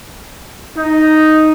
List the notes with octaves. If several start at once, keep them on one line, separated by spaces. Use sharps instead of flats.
D#4